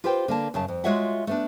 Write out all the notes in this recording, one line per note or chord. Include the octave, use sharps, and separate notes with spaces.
F4 G4 B4 C5 G5
D3 A#3 A5
F#2 C#3 A5
F2
G#3 F4 F#4 C#5 E5 F#5
A3 B3 D4